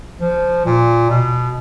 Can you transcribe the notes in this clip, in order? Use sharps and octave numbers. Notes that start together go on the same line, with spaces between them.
F3
A#2
B2